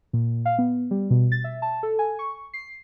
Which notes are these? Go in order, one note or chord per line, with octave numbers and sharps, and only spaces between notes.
A#2
F5
B3
G3
B2
A6
E5
A5
A4
G#5
C#6
C7